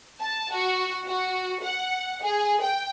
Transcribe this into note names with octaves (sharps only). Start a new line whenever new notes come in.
A5
F#4
F#4
F#5
G#4
G5